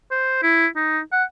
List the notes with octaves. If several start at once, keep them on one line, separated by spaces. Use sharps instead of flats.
C5
E4
D#4
F#5